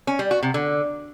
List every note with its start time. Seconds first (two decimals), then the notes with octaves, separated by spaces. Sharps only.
0.07 C#4
0.19 G3
0.31 F#4
0.43 C3
0.54 D3